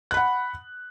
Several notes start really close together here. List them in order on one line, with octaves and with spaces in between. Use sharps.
F#6 B5 F#5